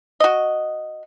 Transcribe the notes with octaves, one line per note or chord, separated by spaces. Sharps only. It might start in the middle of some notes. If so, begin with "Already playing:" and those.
F#4 D#5